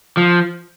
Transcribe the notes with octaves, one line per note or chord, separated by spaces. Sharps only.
F3